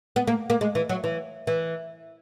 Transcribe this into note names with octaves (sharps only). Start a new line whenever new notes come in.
B3
A#3
A#3
G#3
E3
F#3
E3
E3